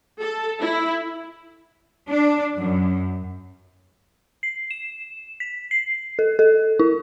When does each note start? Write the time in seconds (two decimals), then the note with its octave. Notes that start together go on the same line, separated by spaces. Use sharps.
0.20 A4
0.60 E4
2.08 D4
2.57 F#2
4.43 C7
4.71 E7
5.40 B6
5.71 C7
6.19 A4
6.39 A4
6.79 E4